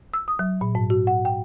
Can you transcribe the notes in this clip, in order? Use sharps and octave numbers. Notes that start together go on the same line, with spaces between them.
E6
D#6
F#3
A#2
G#2
F#4
F#5
G5